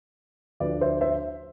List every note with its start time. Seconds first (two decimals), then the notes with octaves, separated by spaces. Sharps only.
0.60 D2 D3 F3 B4 D5
0.81 C5 E5
1.01 C5 E5